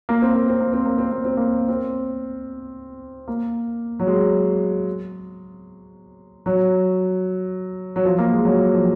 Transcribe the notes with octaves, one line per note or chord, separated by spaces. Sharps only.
A#3
C4
A#3
C4
A#3
C4
A#3
C4
A#3
C4
A#3
C4
A#3
F#3
G#3
F#3
F#3
F3
A#3
G#3
F#3
F3